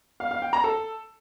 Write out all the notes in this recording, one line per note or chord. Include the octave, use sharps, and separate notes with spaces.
F5
F5
G5
A#5
A4